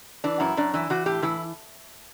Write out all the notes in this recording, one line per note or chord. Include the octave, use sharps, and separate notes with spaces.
E3 D4
F#2 E4
F#2 D4
E3 E4
E3 F#4
A2 G4
E3 E4